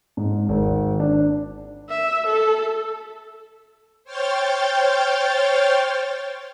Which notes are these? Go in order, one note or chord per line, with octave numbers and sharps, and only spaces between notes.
G#2
G#1
D4
E5
A4
C5 C#5 G5 F6 G6 A6